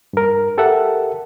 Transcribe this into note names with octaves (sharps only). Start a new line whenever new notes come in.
G2 A#4
G4 A4 A#4 E5 F#5